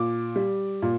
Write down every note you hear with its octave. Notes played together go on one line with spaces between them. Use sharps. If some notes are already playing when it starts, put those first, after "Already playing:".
Already playing: A#2 D6
G3
A#2